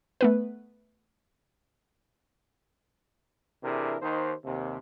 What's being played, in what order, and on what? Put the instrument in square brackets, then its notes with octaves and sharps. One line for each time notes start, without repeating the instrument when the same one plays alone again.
[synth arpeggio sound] A3 B3 B4
[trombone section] C3 E3 D4 E4 G#4 A#4
D#2 D#4 C5
D#2 C3